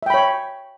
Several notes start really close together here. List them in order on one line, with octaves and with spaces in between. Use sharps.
E5 G5 B5 C#5